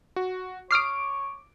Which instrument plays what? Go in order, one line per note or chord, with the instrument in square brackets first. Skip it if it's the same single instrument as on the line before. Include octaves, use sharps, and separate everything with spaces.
[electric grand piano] F#4
[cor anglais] C#5 [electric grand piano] D6 D7 [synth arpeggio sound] D#6 F6 C7